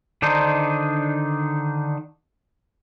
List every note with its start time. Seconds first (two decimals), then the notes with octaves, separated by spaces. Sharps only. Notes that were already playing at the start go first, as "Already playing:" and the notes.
0.22 D3 D#3 D4 D#4 C5